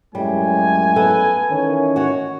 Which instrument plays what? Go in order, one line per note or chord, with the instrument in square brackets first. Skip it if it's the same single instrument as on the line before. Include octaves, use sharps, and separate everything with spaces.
[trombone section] F#2 A2 G#3 [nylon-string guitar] G3 [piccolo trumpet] G#5
[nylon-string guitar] B3 A4
[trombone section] D#3 E3 C#4
[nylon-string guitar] F#4 C#5